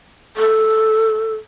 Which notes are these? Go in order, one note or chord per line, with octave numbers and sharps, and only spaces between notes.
A4